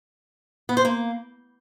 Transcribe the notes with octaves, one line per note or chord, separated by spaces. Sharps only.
B3
C5
A#3